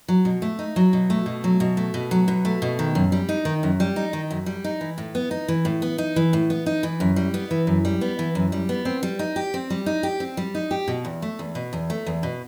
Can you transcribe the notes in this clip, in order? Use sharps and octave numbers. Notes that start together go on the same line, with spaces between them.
F#3
B2
A3
D#4
F#3
B2
A3
B2
F#3
B2
A3
B2
F#3
B2
A3
B2
D#3
F#2
G3
D#4
D#3
F#2
G3
D#4
D#3
F#2
G3
D#4
E3
A2
B3
D#4
E3
A2
B3
D#4
E3
A2
B3
D#4
E3
F#2
G3
B3
E3
F#2
G3
B3
E3
F#2
G3
B3
C4
G3
D#4
G4
C4
G3
D#4
G4
C4
G3
D#4
G4
B2
E2
A3
E2
B2
E2
A3
E2
B2